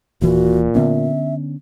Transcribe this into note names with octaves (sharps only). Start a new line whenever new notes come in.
D#1 A#2 E3 F#4
D3 B3 C#4 E5